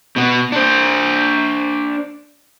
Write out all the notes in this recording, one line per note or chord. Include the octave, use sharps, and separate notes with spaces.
B2 B3
D4 C5